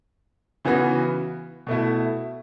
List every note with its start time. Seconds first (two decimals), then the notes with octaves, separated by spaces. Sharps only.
0.65 C#3 E3 B3 F#4
1.67 B2 A3 E4